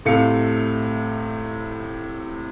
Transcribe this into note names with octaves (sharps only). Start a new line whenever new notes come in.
A2 C3 A3 F5 C#7